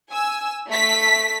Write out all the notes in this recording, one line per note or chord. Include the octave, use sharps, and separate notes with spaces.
G#5 E6
A3 B6